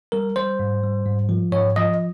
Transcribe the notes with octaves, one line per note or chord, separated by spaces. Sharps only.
G3 A#4
G3 C5
G#2
G3
G#2
F3
G#2 C#5
F3 D#5